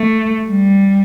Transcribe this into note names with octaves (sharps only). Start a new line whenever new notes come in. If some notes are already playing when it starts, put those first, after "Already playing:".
Already playing: A3
G3